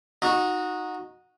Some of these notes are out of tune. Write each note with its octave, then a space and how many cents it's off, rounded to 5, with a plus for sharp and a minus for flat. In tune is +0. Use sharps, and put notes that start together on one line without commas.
D#4 +0 F#4 -15